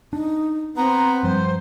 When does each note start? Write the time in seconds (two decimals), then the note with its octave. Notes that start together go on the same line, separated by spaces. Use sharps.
0.13 D4 D#4
0.77 B3 C4 A#5
1.24 G2 F3 G3 C5